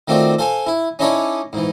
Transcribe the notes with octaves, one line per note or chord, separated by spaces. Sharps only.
D#3 A3 C4 F4 F#4 D5
A4 C5 F5 G#5
E4
C#4 D#4 E4 A4 C#5 D5
G#2 E3